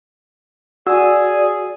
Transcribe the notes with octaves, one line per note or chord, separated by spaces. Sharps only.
F#4 G#4 D5 G#5 E6